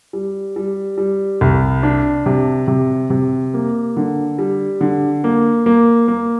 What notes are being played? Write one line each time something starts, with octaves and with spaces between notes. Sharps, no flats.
G3
G3
G3
C2
D4
C3
C3
C3
A#3
D3
G3
D3
A#3
A#3
A#3